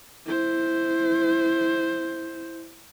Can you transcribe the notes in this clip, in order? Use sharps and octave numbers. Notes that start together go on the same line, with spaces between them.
E4 C5